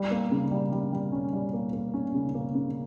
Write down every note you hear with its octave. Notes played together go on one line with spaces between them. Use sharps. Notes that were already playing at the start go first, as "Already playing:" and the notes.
Already playing: G3
A#3
C#3
G3
G3
G3
C#4
G3
A#3
A#3
C#4
C#3
A#3
C#3